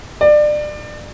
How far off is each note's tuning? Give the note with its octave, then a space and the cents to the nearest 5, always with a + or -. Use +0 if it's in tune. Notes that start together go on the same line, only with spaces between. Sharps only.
D5 +25